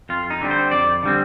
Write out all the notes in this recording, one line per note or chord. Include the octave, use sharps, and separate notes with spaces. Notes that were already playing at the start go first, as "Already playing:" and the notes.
F2 F4
D#4
D3 G3 C4
C5
F2 D5
D3 G3 C4